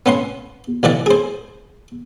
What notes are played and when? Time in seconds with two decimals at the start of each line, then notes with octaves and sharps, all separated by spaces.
0.06 B3 C#4 F#5 C6
0.83 B1 E3 D5 F#5
1.06 G#4 C5